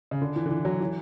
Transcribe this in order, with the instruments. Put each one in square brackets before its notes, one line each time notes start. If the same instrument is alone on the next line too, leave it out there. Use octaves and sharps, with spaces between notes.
[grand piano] C#3
D3
E3
D3
E3
F#3
E3